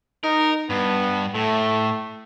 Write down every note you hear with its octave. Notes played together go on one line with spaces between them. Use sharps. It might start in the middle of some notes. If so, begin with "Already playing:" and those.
D#4 A#4
G2 B3
A2 A3